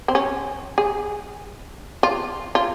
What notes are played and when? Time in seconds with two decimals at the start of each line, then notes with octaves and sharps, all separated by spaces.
0.08 C4
0.15 C#4
0.78 G#4
2.03 F4
2.55 F4